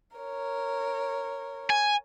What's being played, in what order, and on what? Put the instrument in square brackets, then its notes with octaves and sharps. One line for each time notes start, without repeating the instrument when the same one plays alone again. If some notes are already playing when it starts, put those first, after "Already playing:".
[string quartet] A#4 C#5
[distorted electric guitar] G#5